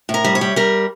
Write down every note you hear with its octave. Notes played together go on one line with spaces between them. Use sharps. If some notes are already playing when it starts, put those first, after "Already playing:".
A2
A#4
G3
C#5
G3
G3 A#4